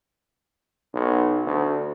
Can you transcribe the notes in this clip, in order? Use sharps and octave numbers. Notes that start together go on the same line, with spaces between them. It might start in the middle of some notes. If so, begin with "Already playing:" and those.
B1
D2